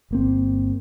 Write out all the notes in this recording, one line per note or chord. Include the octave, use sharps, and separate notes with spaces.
G1 A#3 C4